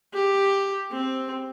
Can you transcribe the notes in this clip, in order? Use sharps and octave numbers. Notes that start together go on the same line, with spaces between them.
G4
C4